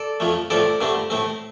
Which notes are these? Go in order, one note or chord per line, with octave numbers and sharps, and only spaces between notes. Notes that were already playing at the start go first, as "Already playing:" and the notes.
Already playing: A4 D5
F2 F3 A3
A2 F3 C4 A4 D5
G2 D3 A3 C4
A2 A3 C4